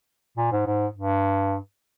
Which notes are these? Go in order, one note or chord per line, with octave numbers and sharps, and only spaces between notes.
A#2
G#2
G#2
G2